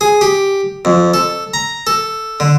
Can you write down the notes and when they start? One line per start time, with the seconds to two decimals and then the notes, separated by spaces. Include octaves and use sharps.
0.01 G#4
0.21 G4
0.85 F2
1.14 A4
1.54 A#5
1.87 A4
2.40 D3